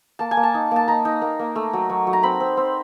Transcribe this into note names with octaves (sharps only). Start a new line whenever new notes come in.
A#3 A5
G#5
A#3
A5
D#4
A#3 A5
D#4 A#5
D#4
A#3
A#3
A3
F#3
F#3
F#3
A#5
C4 B5
C4
C4